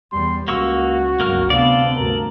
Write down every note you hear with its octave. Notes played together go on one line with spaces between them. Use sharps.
E2 G3 C6
C#2 A#3 F#4 C#6 E6
G1 C#2 F#3 A#3 A#4 F6
D2 C3 B3 A4 D5 F5
D2 G2 A#4